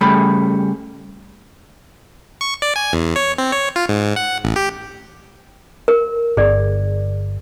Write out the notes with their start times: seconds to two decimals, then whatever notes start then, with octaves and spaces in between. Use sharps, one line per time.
0.01 C#3 G3 A3 B5
2.41 C#6
2.62 D5
2.76 G#5
2.93 E2
3.16 C#5
3.38 C4
3.52 C#5
3.76 F4
3.89 G#2
4.16 F#5
4.44 A1
4.56 G4
5.88 A#4
6.37 G1 G#4 D5